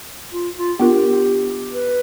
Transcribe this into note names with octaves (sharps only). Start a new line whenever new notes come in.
F4
F4
B3 D4 F4 G4 A#4
B4